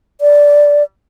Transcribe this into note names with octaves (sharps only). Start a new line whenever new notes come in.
D5